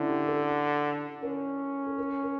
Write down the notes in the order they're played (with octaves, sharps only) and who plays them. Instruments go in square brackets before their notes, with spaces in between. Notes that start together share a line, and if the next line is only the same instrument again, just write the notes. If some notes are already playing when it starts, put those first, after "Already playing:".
Already playing: [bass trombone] D3 [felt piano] C#4 E4
[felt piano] G4
A4
[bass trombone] C#4 [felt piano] A#4
[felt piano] A4
A#4
A#4